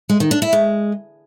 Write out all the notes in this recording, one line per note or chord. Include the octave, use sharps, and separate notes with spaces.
G#3
D#3
D4
E4
G#3